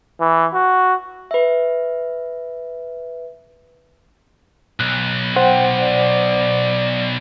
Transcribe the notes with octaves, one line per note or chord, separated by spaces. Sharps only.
E3
F#4
B4 E5
B1 F#6
C5 F#5 G5
D5